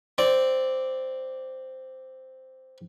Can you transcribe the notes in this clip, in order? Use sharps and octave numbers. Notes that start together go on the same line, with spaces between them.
C4 D5